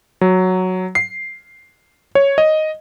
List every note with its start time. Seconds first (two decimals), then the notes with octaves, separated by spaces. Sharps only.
0.21 F#3
0.95 C7
2.15 C#5
2.38 D#5